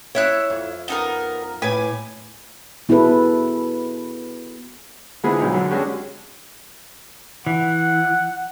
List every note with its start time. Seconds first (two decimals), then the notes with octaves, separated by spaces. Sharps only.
0.15 E4 C#5 E5 F#6
0.50 F2
0.88 B3 D#4 A#4
1.62 A2 B4 G#5 D6
2.89 B3 E4 F#4 G#4 A4 B4
5.24 D3 F3 G#3 B3 E4 G#4
5.39 B1 D#4
5.53 F#2 D3
5.70 G#3 C#4 D4 F#4 G4
7.46 E3 F#5